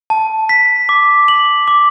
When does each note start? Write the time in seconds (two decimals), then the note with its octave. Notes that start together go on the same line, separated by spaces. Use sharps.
0.10 A5
0.49 B6
0.89 D6
1.28 F#7
1.68 D6